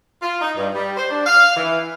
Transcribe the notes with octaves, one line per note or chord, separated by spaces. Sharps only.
F4
D#4
G2
G3
C5
D4
F5
E3